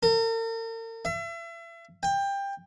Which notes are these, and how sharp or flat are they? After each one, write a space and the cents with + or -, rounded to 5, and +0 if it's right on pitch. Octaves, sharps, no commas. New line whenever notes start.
A#4 -45
E5 +35
G5 +20